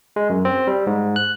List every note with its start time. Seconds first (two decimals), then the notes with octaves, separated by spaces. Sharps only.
0.16 G#3
0.30 F#2
0.45 C4
0.67 G3
0.87 G#2
1.16 F#6